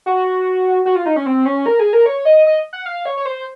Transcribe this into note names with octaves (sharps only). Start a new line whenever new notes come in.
F#4
F#4
F4
D#4
C#4
C4
C#4
A#4
G#4
A#4
C#5
D#5
D#5
F#5
F5
C#5
C#5
C5